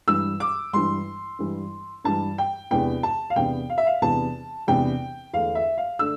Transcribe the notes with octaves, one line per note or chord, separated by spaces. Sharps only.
G2 E3 G3 E6
D6
G2 E3 G3 C6
G2 E3 G3
G2 E3 G3 A5
G5
E2 C3 E3 B3 D4 G5
A5
F5
E2 C3 E3 B3 D4 G5
F5
E5
F5
E2 C3 E3 B3 D4 A5
E2 C3 E3 B3 D4 G5
E2 D3 A3 D4 F5
E5
F5
D3 A3 D4 E6